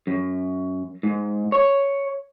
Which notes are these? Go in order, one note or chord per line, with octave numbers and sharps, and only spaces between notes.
F#2
G#2
C#5